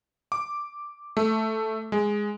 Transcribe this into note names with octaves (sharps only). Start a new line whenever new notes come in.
D6
A3
G#3